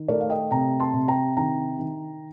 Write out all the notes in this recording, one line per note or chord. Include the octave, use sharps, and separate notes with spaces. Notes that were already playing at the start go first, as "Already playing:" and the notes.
Already playing: D#3
A3 A#4 D5
F5
D#5 G5
C3 G5 A#5
A5 C6
C3
G5 A#5
D#3 G5 A#5
D#3